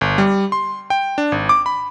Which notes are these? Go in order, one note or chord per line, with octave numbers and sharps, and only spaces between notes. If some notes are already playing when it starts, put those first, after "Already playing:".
G1
G3
C6
G5
D4
G#1
D6
B5